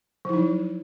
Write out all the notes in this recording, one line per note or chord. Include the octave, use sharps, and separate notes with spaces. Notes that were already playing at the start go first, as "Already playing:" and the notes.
F3 F#3 D#4 E4